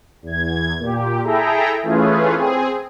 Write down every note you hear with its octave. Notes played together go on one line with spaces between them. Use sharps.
E2 G#6
A#2 G4
E4 G#4 A4 E5 G5 A#5
E3 A3 C#4 F4 G#4 B4
C4 G#4